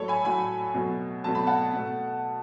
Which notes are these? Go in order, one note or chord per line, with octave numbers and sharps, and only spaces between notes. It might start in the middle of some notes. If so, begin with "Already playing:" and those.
Already playing: A2 F#3 A3 A4 C#5
G#5 B5
A2 F#3 A3 G#5 B5
B2 F#3 A3
B2 F#3 A3 A5
B5
F#5 A5
B2 A3